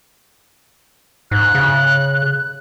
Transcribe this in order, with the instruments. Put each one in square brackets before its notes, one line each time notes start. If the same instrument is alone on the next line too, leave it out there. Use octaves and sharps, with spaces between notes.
[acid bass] G#2 [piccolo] F#6
[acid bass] C#3